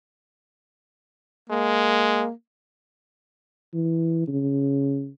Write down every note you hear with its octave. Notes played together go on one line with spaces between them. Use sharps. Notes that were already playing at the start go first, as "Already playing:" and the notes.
G#3 A#3
E3
C#3